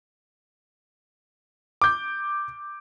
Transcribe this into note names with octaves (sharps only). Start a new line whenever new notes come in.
D6 G6